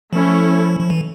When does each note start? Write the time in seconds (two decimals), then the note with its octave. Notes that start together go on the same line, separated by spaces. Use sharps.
0.12 F3 A3 C#4 E4
0.80 F3
0.90 E3